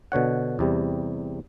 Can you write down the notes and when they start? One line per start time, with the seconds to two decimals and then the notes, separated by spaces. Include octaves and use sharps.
0.12 B2 D3 C#5 F#5
0.59 E2 C3 G3